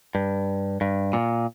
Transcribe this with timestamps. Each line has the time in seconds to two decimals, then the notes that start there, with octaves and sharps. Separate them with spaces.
0.15 G2
0.81 G2
1.13 A#2